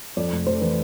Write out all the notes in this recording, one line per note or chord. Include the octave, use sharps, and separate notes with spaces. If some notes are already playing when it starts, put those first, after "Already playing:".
F2 D5
F1
F1 C5
E3 B4